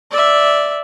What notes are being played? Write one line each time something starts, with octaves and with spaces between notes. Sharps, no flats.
D5 E5